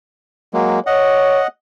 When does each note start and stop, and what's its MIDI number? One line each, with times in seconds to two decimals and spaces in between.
0.53 0.79 54
0.53 0.79 56
0.53 0.79 58
0.87 1.44 73
0.87 1.47 75
0.87 1.47 78